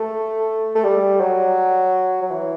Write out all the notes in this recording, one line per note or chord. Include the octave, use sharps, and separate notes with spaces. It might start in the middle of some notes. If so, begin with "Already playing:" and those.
Already playing: A3
A3
G3
F#3
F#3
E3